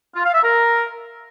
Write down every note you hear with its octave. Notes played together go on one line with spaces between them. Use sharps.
F4
F5
E5
A#4